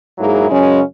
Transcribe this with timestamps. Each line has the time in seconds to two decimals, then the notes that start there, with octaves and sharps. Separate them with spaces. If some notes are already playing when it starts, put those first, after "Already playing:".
0.18 G#2 F#3 A#3 E4 G#4
0.50 F#2 C#3 G#3 C#4